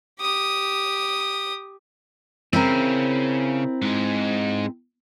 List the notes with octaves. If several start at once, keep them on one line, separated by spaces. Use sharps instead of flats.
G4 D#6
C#3 C4 E4 A#4
G#2 G#3